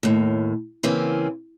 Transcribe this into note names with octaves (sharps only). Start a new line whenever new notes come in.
D#2 A2
C#3 E3 A#3 C4 C#4